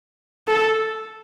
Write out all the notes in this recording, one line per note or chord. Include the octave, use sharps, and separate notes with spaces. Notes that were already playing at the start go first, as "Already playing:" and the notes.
A4